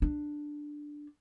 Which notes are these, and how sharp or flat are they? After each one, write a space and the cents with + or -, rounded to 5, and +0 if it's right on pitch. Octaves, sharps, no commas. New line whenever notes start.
D4 +5